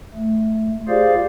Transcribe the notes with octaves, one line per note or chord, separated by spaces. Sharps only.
A3
F4 G4 G#4 C5 D5 F5